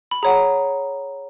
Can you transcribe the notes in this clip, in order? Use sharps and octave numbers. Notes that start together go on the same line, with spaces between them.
B5
G#4 C#5 F#5 A#5